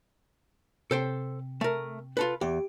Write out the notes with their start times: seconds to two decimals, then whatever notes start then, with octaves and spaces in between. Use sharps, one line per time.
0.91 C3 A4 C5 G5
1.61 A3 A#4
2.17 F4 A4 B4
2.41 E2 G4